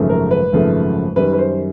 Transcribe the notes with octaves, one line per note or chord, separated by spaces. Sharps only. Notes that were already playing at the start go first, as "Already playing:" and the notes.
Already playing: G#1 F#2 C#3 F3 A3
A#4
B4
G#1 F#2 C#3 F3 A3
F#2 D#3 G3 B4
B4
C5